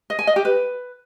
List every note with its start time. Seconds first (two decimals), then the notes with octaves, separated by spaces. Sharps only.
0.10 D#5
0.19 G#5
0.27 D#5
0.36 G4
0.45 B4